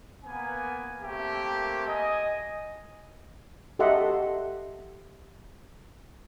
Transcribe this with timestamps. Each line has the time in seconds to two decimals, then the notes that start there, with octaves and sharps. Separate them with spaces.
0.25 A#3 B3 G#5
1.02 A3 A#3 C4 G4 A#4 E5
1.87 D#5 G#5
3.79 G4 A4 D#5 E5 F#5 C6